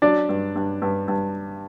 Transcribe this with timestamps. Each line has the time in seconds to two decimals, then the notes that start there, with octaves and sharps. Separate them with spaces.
0.02 F#3 D4 D5
0.29 G2
0.56 G2
0.82 G2
1.08 G2